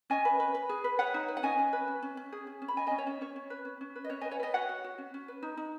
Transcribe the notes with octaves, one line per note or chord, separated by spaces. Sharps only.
C#4 D#5 G#5
B4
B4
B4
G#4
B4
B4 C#5 F#5
D#4
B4
F#5
C#4 D#5 G#5
C#4
B4
C#4
C#4
C#4
G#4
C#4
C#4
B5
C#4 D#5 G#5
C#4 D#5 G#5
C#5 F#5
C#4
C#4 C#5
C#4
B4
C#4
C#4
B4
D#5
C#4 C#5
B4 D#5 G#5
C#5 F#5
B4 D#5 G#5
F#4 C#5 F#5
F#4
F#4
C#4
C#4
B4
D#4
D#4